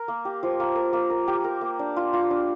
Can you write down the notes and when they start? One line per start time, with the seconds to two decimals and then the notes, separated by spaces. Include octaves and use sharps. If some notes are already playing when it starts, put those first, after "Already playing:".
Already playing: A#4
0.08 A#3
0.25 G4
0.43 F3
0.60 A#3
0.76 A#4
0.93 A#3
1.10 A#4
1.28 G4
1.44 A#4
1.61 A#3
1.79 D4
1.96 F4
2.13 F4
2.31 D4